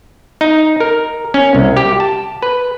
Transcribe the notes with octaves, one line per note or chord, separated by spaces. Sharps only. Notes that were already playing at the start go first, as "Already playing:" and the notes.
D#4
A#4
C#4
C2
G4
A5
B4